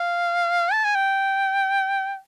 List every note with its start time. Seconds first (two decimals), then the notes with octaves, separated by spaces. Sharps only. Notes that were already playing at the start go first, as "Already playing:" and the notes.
Already playing: F5
0.72 A5
0.84 G#5
0.95 G5